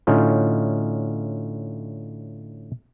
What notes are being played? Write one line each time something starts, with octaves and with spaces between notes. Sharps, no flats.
A2 D3 C#4 D#4 F4